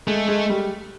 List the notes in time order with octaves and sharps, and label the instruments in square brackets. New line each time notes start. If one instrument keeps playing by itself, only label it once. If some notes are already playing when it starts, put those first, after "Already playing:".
[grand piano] G#3 [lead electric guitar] A3
[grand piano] G#3
G3